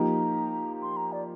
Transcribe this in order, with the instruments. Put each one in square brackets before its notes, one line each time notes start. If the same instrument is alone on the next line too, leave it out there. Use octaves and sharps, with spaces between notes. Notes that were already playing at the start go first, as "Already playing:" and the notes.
Already playing: [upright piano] F3 A#3 D#4 G4 [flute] A#5
[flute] C6
A#5
D5